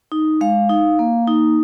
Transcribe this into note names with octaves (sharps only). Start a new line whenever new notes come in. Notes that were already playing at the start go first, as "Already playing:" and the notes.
D#4
G#3 F5
D#4
A#3
D#4